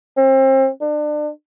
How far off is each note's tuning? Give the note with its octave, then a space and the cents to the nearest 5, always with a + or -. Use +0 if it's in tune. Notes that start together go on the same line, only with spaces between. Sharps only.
C4 +35
D4 +30